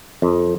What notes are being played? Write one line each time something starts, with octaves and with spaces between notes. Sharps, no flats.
F2